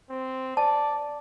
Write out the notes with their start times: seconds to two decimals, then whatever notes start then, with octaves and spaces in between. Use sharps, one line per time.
0.10 C4
0.57 D5 A5